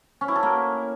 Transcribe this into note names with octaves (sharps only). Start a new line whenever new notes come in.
C#4
E4
A4
A#3